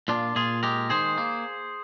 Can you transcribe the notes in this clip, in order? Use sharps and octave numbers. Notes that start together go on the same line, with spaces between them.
A#2 D4 F4
A#2 F4 G#4
G#3 G4 A#4
D#3 G#4 C5
A#3